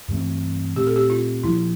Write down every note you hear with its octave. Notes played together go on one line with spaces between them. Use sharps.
G2 E3 A3 C4
A#2 A3 C4 G4
A4
G4
F4
A#2 F3 A#3 E4